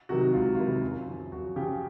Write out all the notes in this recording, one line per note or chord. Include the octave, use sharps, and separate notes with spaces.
C3 D#3 F#3 F#4
C#2 F4
F4
C3 D#3 F#3 E4
F#2
C#3 F3
F#2 F#4
C#3 F3 G4